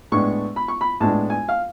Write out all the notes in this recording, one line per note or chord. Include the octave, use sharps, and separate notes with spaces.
A2 G#3 B3 D4 C#6
B5
C#6
B5
A2 G#3 B3 D4 A5
G#5
F5